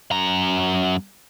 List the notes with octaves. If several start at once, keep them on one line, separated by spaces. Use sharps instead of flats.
F#2 A#5